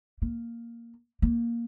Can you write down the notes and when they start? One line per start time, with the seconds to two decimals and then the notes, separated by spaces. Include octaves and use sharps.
0.22 A#3
1.22 A#3